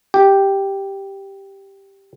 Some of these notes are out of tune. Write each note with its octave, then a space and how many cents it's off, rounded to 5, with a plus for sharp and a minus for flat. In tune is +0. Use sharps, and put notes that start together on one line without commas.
G4 +0